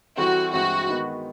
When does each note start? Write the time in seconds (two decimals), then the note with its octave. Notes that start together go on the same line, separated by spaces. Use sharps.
0.17 E3 G3 C4 E4 F#4 A4
0.53 G2 E3 G#3 C4 E4 F#4
0.88 D#3 G#3 B3 D#4